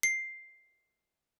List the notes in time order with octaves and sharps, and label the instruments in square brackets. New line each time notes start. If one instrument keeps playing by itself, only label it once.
[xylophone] C7